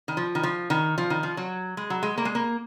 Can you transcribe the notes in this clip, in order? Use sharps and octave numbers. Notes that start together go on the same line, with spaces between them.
D#3
F3
D#3
F3
D#3
F3
D#3
F3
F#3
G#3
F#3
G#3
A#3
G#3
A#3